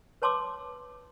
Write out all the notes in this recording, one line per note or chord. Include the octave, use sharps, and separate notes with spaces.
B4 C#5 A5 C6 D6 E6